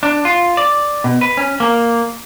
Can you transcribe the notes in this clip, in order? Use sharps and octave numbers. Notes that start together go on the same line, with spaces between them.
D4
F4
D5
B2
B4
C#4
A#3